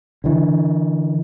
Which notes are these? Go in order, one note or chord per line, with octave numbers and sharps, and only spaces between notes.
D3 E3